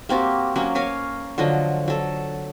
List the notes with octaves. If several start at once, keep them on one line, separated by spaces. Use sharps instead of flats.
A#3 C4 F#4 G4
F#3 A#3 C#4
A#4 C#5 F5 G#5
D3 F3 F#3 D#5
F#3 A4